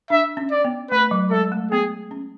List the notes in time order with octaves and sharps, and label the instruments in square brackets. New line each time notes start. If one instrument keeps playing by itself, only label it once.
[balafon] D4 [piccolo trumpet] E5
[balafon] C#4
[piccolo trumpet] D5
[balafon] B3
[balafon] A3 [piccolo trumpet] B4
[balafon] F#3
[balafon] G#3 [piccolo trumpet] A4
[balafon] A3
[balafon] B3 [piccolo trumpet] G#4
[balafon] C#4